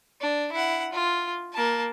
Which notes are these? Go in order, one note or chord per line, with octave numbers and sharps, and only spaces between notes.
D4
E4 F#5
F4
A#3 A5